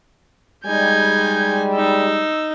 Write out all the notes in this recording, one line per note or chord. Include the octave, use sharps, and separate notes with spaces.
G3 G#3 D#4 G#5 G6 G#6
D#4 E6